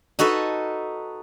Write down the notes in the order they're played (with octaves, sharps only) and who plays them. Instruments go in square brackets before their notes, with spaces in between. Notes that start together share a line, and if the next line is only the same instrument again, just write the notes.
[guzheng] D#4 F#4 A4 B4